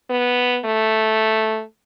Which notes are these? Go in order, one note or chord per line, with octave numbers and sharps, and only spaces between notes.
B3
A3